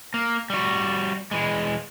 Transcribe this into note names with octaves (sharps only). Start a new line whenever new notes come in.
A#3
G3 F#4
E3 G#3